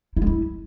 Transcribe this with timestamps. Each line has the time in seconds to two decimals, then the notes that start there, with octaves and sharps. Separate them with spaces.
0.17 E4
0.22 G#3
0.27 E4